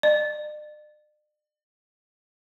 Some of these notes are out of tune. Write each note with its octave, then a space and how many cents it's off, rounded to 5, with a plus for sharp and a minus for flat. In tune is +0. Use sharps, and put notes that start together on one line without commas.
D5 +45